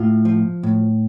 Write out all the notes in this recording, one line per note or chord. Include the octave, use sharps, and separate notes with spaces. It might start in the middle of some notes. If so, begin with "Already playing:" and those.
Already playing: A2 F4
F3
A2